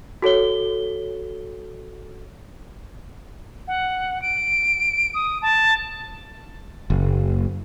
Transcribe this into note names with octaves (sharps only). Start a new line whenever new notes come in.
F#4 A4 C#5 G7
F#5
D7
D#6
A5
F#1